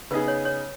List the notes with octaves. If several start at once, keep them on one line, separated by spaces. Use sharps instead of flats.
C#3 B3 D#4 G#4 B4
C#5
C#5